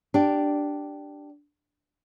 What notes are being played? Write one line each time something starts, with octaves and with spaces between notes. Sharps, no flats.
D4 G4